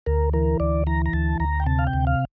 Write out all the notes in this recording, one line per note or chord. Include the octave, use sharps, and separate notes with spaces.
D2 A#4
E3 A#4
D2 D5
E3 A#5
A#5
D2 A5
D2 A#5
G5
C3 A5
F5
G5
D2
F5